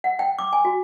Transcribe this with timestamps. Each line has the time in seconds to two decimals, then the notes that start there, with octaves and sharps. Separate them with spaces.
0.04 F#5
0.19 G5
0.39 D6
0.53 G#5
0.65 F#4